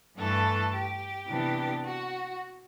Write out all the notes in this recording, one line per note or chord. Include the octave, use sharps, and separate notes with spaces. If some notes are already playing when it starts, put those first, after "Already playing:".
G2 E3 A3 A4
G4
C3 E3 B3 D4
F#4